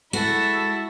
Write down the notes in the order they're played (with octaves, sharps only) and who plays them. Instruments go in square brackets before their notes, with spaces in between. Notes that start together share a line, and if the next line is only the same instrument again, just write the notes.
[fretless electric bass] G#3 [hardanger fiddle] E4 [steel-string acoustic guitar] F#4 [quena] A4